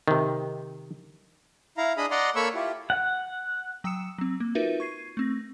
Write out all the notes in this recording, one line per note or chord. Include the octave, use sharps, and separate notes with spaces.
C3 D#3
E4 F5 A#5
D4 G#4 D#5 B5 D#6
D5 D#5 F#5 A#5 C6
A#3 A4 C#5 B5 C#6 E6
E4 F4 G4
F#5
F#3 G5 D#6 E6 C#7 E7
F#3 C4
A#3
D#4 F4 F#4 A#4 B4 E5
C#6 G#6 C7 D#7
A3 C4 A#6